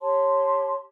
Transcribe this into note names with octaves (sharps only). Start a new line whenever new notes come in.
G4 C#5 A5 C6